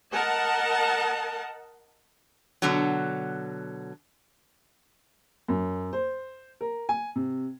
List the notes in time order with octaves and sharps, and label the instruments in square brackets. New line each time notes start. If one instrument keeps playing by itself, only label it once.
[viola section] A#4 D#5 F#5 A5
[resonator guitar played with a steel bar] B2 D3 F#3
[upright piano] F#2
C5
A#4
G#5
C3